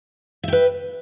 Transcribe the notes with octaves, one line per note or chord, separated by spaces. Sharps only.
B4 E5 G5